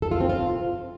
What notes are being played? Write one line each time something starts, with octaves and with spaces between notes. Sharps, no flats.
A4
F4
C4
F4